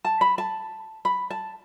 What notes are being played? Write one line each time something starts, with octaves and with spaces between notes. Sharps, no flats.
A5
B5
A5
B5
A5